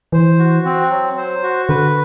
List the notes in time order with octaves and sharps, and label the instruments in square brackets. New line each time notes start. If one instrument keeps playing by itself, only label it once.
[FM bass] E3 [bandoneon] C5
[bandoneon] F#4
C4
F#3
C5
F#4
[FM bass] D3 [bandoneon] B4